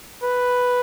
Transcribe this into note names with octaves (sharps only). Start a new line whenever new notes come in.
B4